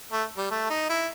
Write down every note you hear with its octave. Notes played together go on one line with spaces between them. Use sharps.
A3
G3
A3
D#4
E4